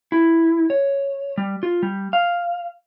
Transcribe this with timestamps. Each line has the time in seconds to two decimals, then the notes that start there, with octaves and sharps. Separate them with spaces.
0.12 E4
0.70 C#5
1.38 G3
1.63 F4
1.83 G3
2.13 F5